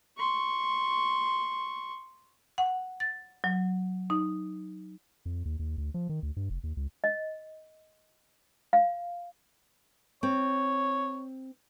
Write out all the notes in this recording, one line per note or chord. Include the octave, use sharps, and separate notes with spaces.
C6 C#6
F#5
A6
F#3
D#4
F2
D#2
D#2
D2
F3
D#3
D2
G2
F1
D#2
C#2
D#5
F5
C4 C#5